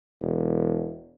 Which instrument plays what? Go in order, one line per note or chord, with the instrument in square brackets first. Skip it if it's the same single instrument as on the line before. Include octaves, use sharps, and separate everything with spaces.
[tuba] E1